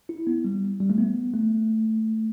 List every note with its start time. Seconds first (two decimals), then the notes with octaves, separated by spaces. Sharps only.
0.09 E4
0.27 B3
0.44 G3
0.80 G3
0.90 A3
0.98 B3
1.34 A3